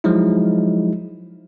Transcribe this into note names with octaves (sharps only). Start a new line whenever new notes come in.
F3 F#3 G#3 D#4 E4